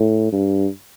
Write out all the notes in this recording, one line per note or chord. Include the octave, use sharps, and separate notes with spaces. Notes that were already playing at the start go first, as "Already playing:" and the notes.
Already playing: A2
G2